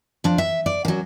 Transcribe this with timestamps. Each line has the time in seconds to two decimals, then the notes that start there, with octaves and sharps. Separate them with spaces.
0.24 F3 D4
0.38 E5
0.66 D5
0.85 F#2 F#3